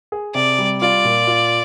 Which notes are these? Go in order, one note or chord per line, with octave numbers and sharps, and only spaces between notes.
G#4
C3 D5
G3
F4 D5
A#2
F4